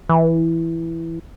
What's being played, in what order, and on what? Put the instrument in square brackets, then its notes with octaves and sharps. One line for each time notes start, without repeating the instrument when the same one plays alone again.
[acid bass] E3